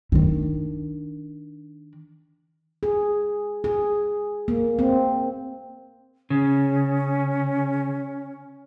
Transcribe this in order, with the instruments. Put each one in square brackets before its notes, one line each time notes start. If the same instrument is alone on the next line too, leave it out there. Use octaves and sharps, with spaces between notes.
[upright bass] D#3 D4
[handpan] G#4
G#4
A#3
C4
[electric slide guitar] C#3 [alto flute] C#4